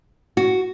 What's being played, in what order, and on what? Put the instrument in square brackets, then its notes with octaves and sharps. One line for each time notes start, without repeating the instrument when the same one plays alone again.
[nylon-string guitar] F#4